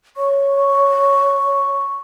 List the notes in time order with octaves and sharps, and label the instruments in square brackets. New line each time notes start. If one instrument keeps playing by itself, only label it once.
[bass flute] C#5 [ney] C#6